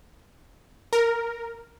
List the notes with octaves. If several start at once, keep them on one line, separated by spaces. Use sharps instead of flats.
A#4